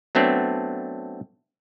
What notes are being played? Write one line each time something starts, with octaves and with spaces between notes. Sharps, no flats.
F#3 A3 B3 C4 D4